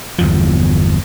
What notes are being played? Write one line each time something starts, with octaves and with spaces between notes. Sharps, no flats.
G1 E2 F3